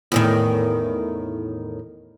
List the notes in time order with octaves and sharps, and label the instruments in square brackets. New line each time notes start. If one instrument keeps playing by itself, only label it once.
[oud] E2 A2 D#3